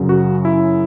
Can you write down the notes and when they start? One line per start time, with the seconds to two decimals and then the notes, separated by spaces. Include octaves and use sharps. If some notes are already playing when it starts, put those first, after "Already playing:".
Already playing: F#2 C#3 F#3
0.09 F#4
0.45 E4